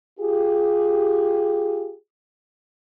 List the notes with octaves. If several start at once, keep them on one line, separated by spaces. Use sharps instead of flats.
F4 G4 G#4